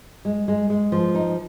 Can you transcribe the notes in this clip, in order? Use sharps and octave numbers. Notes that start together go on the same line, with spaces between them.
G#3
G#3
G#3
F3
D#4